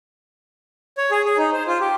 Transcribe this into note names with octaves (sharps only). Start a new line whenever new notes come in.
C#5
G#4
G#4
D#4
C5
F4
G4